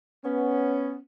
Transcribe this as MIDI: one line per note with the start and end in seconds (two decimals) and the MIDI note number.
0.25 0.98 59
0.25 0.98 61